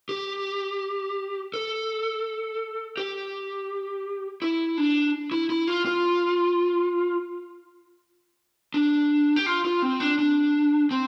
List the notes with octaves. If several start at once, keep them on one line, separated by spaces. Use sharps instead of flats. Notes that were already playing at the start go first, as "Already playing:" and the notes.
G4
A4
G4
E4
D4
E4
E4
F4
F4
D4
G4
F4
F4
C4
D4
D4
C4